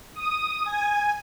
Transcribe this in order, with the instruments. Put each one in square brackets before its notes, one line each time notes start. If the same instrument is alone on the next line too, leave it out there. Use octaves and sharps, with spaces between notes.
[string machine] D#6
G#5